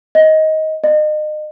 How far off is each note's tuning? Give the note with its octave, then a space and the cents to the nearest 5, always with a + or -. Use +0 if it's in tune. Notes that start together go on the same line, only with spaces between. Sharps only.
D#5 +15
D#5 -35